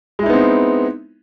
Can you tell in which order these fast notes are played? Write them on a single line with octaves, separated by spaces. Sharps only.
G#3 E4 D#4 B3 C4